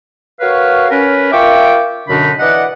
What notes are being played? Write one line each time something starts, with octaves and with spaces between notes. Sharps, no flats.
F#4 A#4 B4 C#5 F5
C#4 A#4 B4
F4 A#4 E5 G5 C#6 D6
F#2 B2 D3 D4 D#4 B5
E3 D5 D#5 F#5